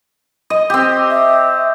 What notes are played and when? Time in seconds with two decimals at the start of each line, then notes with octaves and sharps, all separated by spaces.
0.50 D#5
0.70 C4 G4
1.10 E5